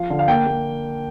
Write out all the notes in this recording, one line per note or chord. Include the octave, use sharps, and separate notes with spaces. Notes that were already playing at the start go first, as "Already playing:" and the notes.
Already playing: F3 F5
D3
F5
A#3 G5
A#3